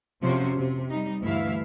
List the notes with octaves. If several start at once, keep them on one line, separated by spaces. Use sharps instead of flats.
F2 C3 F3 C#4 F#4 C5
C3
G3 D#4
D2 G2 E3 E4 E5 F5